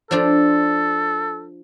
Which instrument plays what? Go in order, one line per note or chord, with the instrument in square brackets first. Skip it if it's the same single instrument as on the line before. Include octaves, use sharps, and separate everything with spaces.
[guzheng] F3 D4 C5 [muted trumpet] A4